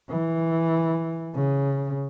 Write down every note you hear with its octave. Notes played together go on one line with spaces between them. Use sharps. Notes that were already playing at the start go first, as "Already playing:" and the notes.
E3
C#3